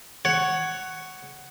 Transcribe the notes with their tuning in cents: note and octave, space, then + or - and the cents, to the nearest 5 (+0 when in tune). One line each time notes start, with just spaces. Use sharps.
C#5 +0 F#5 +10